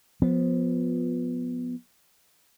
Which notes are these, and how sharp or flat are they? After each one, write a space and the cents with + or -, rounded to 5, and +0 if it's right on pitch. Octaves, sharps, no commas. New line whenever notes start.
F3 +20 B3 +0